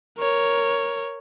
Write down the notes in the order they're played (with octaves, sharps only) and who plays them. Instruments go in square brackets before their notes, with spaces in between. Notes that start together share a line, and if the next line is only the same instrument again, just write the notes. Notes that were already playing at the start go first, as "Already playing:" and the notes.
[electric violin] A#4 C#5